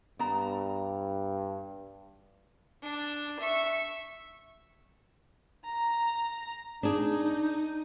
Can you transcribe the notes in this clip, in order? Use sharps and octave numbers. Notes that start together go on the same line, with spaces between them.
G2 B3 A#5
D4
E5 C#6
A#5
D4 D#4 G#4